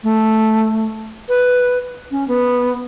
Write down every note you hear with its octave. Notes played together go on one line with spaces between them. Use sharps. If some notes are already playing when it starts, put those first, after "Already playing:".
A3
B4
C#4
B3